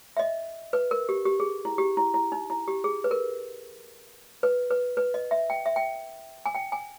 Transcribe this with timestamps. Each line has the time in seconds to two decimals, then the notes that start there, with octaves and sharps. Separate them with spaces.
0.17 E5
0.19 D#5
0.73 B4
0.91 A#4
1.09 G4
1.25 G4
1.40 G#4
1.65 E4
1.78 G4
1.97 E4
2.14 E4
2.32 D#4
2.50 E4
2.68 G4
2.84 G#4
3.04 B4
3.11 A#4
4.43 B4
4.71 B4
4.97 B4
5.14 D#5
5.31 E5
5.50 G5
5.66 E5
5.76 G5
6.46 G#5
6.55 G5
6.72 G#5